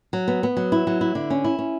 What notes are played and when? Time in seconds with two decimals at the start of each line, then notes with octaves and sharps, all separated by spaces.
0.13 F#3
0.28 B3
0.43 B3
0.57 F#3
0.72 E4
0.87 F#3
1.01 E4
1.15 D3
1.30 C#4
1.44 E4
1.59 C#4